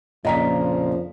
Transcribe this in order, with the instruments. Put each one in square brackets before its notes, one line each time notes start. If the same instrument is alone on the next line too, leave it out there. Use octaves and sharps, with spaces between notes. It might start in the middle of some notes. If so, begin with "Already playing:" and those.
[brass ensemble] A#1 F2 F3 [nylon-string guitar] A#2 C#3 [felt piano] D#5 A#5 B6